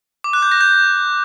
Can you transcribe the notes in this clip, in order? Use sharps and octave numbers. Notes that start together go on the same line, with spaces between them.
D6
F#6
G6
A#6
G6